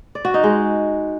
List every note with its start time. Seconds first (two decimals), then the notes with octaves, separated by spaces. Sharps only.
0.15 D5
0.25 F#4
0.34 D#4
0.43 G#3